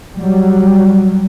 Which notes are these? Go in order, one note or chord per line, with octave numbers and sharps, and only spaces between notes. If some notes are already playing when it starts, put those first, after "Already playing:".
F#3 G3